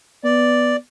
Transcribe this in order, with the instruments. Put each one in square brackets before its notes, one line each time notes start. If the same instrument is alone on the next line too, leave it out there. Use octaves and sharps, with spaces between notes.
[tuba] B3 [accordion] D5